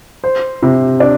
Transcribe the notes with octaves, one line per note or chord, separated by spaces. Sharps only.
C5
C3
D4